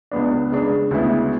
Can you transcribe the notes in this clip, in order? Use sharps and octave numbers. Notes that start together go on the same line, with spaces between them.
C#2 C#3 G#3 B3 D4
C#3 G#3 D4
D2 C#3 G#3 B3 E4